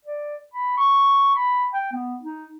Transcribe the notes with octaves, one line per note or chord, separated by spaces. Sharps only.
D5
B5
C#6
B5
G5
B3
D#4